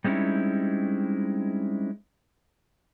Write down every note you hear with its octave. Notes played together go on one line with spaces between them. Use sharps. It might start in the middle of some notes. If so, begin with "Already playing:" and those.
G3 G#3 C4 C#4 D#4 E4